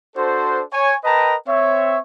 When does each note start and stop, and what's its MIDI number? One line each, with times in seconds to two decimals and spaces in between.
0.16 0.61 62
0.16 0.61 66
0.16 0.61 69
0.16 0.61 72
0.72 0.94 73
0.72 0.94 80
1.04 1.34 70
1.04 1.34 71
1.04 1.34 75
1.04 1.34 79
1.04 1.34 81
1.04 1.34 82
1.47 1.98 60
1.47 1.98 73
1.47 1.98 76